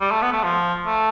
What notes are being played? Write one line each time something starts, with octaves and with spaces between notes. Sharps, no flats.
G3
A3
B3
A3
F3
A3